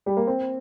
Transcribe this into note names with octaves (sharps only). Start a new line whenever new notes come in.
G3
A#3
C4